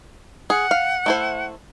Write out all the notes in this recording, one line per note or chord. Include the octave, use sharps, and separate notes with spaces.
G#4 F#5
F5
A3 E4 C5